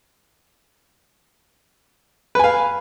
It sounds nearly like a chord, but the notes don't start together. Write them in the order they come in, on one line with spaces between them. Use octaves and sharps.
B4 G#5 F5